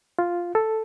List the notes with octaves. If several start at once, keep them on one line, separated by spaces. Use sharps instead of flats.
F4
A4